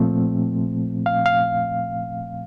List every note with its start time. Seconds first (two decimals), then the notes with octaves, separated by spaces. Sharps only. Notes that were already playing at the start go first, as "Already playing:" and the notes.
Already playing: A#2 F3 A3 C4
1.06 F5
1.26 F5